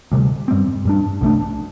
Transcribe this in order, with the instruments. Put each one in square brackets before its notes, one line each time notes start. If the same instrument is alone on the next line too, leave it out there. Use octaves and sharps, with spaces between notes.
[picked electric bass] D2 C3 G3
G2 G3 C4
G2 G3 D4
C2 C3 A3 D4